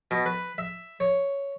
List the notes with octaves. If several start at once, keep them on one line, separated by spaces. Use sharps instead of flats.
B2
B4
E5
C#5